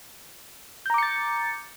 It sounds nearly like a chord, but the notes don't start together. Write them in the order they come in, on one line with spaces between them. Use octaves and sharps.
G6 A#5 D6 C#7 A6